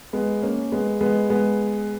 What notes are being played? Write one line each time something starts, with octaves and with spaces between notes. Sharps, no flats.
G#3 B3
A#3 C#4
G#3 B3
G#3 B3
G#3 B3